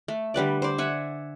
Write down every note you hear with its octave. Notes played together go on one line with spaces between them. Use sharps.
A3
D3 G3 B4 D5
C5 D5
E5 F#5 G#5